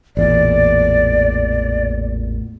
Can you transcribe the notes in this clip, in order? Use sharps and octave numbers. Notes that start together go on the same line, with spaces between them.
A1 E2 A#2 D5